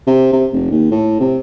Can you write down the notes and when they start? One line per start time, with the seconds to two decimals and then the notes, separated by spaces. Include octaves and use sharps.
0.07 C3
0.33 C3
0.52 F1
0.71 D#2
0.91 A2
1.20 C3